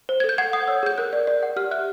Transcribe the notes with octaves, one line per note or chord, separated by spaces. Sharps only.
C5
G#6
A4
G6
F#5 G#6
F#5 D#6
C#5 E6
G#4 G6
A#4 F#6
D5
D5
F#5
G4 F6
E5 F#6